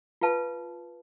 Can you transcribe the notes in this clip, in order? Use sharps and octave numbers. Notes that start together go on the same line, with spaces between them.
F4 B4 F5 A5